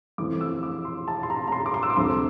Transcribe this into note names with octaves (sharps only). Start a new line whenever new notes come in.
F2 E3 A3 C4 D6
E6
D6
C6
A5
C6
A#5
A#5
C6
D6
C6
E6
D6
D2 C3 F3 A3 C6